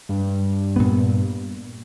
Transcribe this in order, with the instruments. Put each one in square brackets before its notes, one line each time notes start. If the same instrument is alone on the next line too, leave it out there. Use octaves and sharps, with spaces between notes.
[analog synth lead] G2
[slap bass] A#2 B3